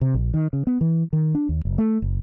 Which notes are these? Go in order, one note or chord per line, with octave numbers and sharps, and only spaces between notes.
C3
A#1
D#3
C#3
B3
E3
D#3
D4
D#2
F#1
A3
F#1